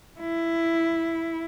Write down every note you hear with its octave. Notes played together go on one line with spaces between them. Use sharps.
E4